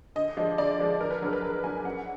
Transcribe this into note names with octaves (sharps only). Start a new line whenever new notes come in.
D3 D#5
F3 G#3 D4
D3 D5
F3 G#3 D4
D3 A#4
B4
F#3 D4 A#4
B4
D3 A#4
F#3 D4 G#5
F#2 F#5